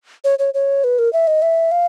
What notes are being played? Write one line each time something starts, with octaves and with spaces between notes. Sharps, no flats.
C#5
C#5
C#5
B4
A#4
E5
D#5
E5
F5